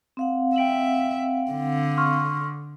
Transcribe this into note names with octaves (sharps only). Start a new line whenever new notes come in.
C4 F5 F#5
E5 G5 D7 F#7
D3
C6 C#6 F6